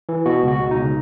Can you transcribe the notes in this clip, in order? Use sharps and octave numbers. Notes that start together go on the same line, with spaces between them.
E3
B2 F#4
C#2
F#4
B2
C#2 D#4